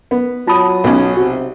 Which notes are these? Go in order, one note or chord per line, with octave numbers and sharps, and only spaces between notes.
B3
F#3 F4 A5 B5 D#6
B1 C#4
C3 F#4